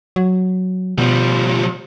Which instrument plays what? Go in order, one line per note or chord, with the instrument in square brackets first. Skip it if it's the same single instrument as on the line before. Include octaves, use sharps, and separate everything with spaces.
[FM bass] F#3
[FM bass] B2 [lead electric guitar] F3 G3